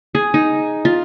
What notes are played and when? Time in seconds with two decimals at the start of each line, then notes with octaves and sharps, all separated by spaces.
0.15 G#4
0.34 D#4
0.85 F4